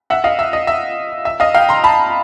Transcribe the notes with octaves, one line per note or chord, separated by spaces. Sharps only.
E5 F#5
D#5 F5
E5
D#5
E5
E5
D#5 F5
F5 G5
A#5 C6
A5 B5